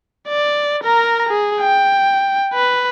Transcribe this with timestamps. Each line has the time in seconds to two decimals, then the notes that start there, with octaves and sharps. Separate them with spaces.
0.28 D5
0.84 A#4 A#5
1.29 G#4
1.61 G5
2.54 B4